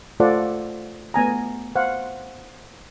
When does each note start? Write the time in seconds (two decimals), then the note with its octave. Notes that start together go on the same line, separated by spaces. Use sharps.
0.20 A3 F4 A4 C5 D5 F#5
1.14 A3 B3 G#5 A#5
1.75 C5 F5 F#5